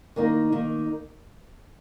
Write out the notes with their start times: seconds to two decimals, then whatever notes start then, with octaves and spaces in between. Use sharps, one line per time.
0.16 D#3 A#3 D#4
0.52 D#3 A#3 D#4